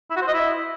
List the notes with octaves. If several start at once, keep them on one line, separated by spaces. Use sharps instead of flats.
E4
F#4
C5
D#5
E4